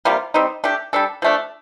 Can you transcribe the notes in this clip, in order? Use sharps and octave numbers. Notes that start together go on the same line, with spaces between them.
C3 G3 A#3 F4
G3 C4 D#4
A3 D4 G4
G3 D4 A4
F3 A3 D4